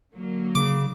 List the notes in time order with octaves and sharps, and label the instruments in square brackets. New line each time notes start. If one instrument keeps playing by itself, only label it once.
[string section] D3 F#3 A#3
[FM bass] C#3 [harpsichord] D6